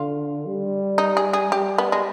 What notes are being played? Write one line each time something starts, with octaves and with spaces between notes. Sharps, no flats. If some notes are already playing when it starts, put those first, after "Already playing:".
Already playing: D3 F4
G3
D#4
G#4
G#4
G3 G4
B3
G#3